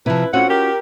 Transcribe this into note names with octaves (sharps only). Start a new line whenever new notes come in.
C3 F3 E4 B4
A2 C4 C#4 F4 F#4 F#5
G4 A#4